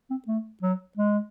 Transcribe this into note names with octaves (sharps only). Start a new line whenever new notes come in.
C4
A3
F#3
G#3